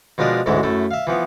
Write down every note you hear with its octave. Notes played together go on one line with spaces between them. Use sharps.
B2 F3 G#3 D4 A#4 B4
A1 D2 G#2 F#3 G#3 E4
F#2 A3 E4
E5 F5
E3 F3 B3